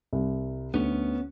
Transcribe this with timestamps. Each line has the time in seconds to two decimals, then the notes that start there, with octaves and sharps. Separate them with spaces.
0.13 C2
0.74 D2 B3 C#4